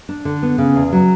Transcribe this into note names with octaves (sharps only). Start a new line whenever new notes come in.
D4
D3
B3
C#3
E2
F#3